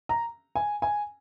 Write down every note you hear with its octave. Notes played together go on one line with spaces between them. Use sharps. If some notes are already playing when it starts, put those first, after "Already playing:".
A#5
G#5
G#5